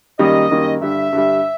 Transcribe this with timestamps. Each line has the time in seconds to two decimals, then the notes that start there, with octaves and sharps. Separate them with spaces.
0.19 F#2 D#3 G3 A#3 D#5
0.50 F#2 D#3 G3 A#3
0.81 G2 D3 G3 E5
1.13 G2 D3 G3